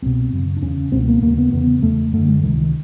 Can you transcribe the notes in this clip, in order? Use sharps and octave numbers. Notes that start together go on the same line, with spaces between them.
C2 B2 C4
F#2 C#3
D4
E2 C#3 C#4
C#2 B2 C4
A3
A#3
D#2 C#3 A#3
B3
E2 C#3 B3
E2 C#3 A3
F#2 D3 A3
G#3
C#2 C3 D#3
D#3